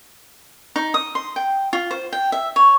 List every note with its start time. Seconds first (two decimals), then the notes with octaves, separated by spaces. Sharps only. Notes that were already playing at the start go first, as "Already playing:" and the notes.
0.76 D#4
0.94 D#6
1.15 C6
1.36 G5
1.73 F4
1.91 C5
2.13 G5
2.32 E5
2.56 C#5